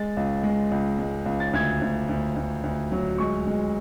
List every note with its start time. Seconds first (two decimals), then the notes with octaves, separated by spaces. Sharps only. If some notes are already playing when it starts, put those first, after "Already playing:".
Already playing: G#3 A6
0.17 C#2
0.43 G#3
0.71 C#2
0.99 G#3
1.26 C#2
1.40 A6
1.53 D2 G#6
1.81 D2
2.09 D2
2.36 D2
2.64 D2
2.92 F#3
3.18 G#3 C#6
3.47 G#3